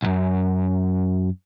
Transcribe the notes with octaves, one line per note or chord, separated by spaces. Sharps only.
B1 F#2